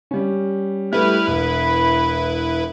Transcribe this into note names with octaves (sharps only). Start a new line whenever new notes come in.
G3 C#4
G3 A3 E4 B4 F6
E1 B5